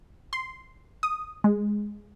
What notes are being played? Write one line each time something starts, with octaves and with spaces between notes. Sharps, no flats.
C6
D#6
G#3